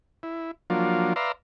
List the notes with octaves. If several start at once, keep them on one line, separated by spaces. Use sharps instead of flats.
E4
F3 F#3 A#3 D4 F4
B4 D5 E5 F5 A#5 C6